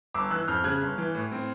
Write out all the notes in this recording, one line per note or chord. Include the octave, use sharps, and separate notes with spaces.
G1 D6 E6
E3 E6 F#6
F2 F6 G6
C#3 F#6 G#6
G1
E3
A2
C4